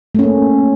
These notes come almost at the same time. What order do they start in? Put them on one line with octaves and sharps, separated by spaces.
A3 C#4 A#3